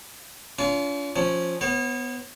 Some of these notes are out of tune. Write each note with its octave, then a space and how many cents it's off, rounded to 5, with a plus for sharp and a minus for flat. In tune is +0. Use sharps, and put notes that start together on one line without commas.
C#4 +45 F4 -15
F3 +10 C#4 +0
B3 +5 C#5 -40